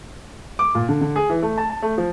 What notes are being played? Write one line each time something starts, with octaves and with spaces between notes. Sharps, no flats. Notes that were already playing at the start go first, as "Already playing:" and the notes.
D6
A#2
D3
D3
G#4
E3
A3
A5
A5
A3
F3